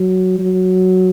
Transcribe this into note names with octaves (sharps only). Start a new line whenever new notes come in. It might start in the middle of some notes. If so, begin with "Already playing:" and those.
Already playing: F#3
F#3